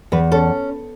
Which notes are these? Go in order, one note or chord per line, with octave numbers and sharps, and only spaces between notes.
E2 B4
C#4 A4